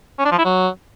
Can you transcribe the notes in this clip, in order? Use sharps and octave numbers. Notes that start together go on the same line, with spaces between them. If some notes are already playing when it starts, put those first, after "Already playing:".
C#4
D4
F3
E4
F#3